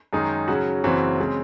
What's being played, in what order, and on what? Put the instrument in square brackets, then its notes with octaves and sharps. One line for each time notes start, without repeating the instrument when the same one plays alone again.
[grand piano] F#2 D#3 G#3 D#4
C#3 F#3 C#4 F#4
F#1 F#2 E3 C4 F#4
C#3 G#3 C4